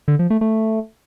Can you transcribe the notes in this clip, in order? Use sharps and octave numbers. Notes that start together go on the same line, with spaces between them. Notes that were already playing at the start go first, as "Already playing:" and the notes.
D3
F3
A3
A3